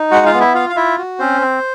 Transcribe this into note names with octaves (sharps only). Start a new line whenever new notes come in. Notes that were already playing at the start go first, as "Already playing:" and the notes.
Already playing: D#4
G#3 F#4 F#5
F4 F5
B3
E4 E5
F4 F5
F5
E4 F4 E5
F#4
C4 C#4 C5
C4